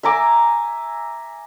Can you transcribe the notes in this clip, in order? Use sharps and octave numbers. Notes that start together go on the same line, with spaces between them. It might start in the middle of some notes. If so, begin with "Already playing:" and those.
E5 G#5 A#5 D6